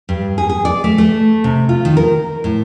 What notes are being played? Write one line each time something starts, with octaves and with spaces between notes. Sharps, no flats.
G2
G#4
G#4
D5
A3
A3
C3
F4
D#3
A#4
A2